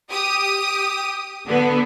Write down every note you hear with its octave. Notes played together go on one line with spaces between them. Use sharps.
G4 D#6
D3 B3